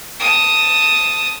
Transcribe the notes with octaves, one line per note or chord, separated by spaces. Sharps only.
A5 D#6